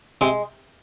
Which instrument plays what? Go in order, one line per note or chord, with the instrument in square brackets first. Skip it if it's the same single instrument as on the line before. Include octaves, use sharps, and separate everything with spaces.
[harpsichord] C3 [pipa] G#3